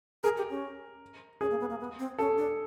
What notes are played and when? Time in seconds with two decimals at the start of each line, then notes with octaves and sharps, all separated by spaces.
0.23 G#4 A#4
0.37 G4
0.50 C#4
1.41 C#4 G#4
1.50 A#3
1.60 B3
1.70 A#3
1.80 B3
1.99 C4
2.19 C#4 A4
2.38 D4